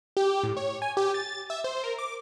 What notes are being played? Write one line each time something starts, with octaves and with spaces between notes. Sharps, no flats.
G4
A2
C#5
G#5
G4
A6
E5
C5
A#4
D6